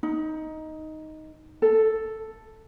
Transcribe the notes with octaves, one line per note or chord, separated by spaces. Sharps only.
D#4
A4